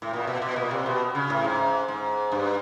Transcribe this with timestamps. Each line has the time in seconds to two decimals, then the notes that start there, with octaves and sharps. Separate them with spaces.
0.02 A2
0.13 A#2
0.27 B2
0.42 B2
0.56 A#2
0.71 C3
0.86 B2
1.15 C#3
1.30 A2
1.44 G#2
1.88 G#2
2.32 G2